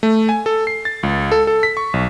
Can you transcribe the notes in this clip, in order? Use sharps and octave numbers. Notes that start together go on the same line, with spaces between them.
A3
G#5
A4
C7
A6
C#2
A4
A4
B6
C#6
B1